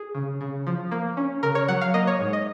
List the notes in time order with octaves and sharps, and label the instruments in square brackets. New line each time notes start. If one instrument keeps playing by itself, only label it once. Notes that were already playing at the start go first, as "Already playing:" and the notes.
Already playing: [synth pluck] G#4
C#3
C#3
F3
A#3
C#4
C#3 A#4
C#5
F#3 F#5
F5
A#3 D#5
C#5
G#2
D#5